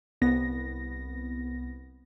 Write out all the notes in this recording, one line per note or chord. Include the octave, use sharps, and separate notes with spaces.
C2 B3 A#6